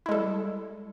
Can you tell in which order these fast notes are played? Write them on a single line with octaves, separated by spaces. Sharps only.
E4 G#3 A4 G3